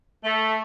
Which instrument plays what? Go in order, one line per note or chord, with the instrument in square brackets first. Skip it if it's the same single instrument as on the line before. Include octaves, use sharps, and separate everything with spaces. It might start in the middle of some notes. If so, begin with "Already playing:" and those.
[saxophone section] A3